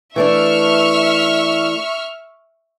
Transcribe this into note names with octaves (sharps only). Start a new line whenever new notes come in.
E3 A3 D4 E5 C#6 F6